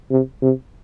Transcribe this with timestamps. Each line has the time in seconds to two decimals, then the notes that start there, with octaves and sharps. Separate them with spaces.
0.11 C3
0.42 C3